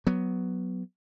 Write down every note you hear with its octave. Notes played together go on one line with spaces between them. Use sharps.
F#3 B3